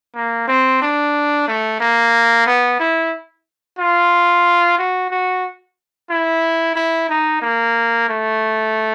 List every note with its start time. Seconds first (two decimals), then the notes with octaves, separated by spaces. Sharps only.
0.15 A#3
0.48 C4
0.82 D4
1.48 A3
1.80 A#3
2.46 B3
2.80 E4
3.78 F4
4.78 F#4
5.10 F#4
6.10 E4
6.75 E4
7.09 D#4
7.42 A#3
8.08 A3